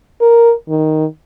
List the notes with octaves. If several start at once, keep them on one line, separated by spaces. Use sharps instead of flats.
A#4
D#3